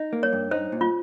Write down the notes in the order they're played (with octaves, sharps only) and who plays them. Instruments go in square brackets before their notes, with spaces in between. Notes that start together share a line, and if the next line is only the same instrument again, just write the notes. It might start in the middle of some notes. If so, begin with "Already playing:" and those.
Already playing: [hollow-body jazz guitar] D#4
A#3
[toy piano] C#5
[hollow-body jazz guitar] G2
[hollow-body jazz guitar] D#4 [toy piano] C5
[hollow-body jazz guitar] A#2
[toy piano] F4